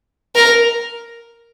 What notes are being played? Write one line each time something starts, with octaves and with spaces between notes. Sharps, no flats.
A#4